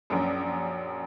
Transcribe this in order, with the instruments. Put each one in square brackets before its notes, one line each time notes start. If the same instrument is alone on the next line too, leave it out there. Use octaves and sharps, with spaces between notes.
[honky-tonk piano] A#1 F#2